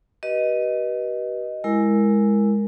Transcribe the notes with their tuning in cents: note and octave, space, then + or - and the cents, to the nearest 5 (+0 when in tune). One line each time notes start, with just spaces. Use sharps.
G4 -45 B4 -30 D#5 +0
G#3 +0 E4 +0 A#4 +0